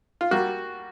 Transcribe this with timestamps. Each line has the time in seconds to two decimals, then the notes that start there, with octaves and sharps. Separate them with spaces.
0.21 F4
0.31 G3 A#3 F#4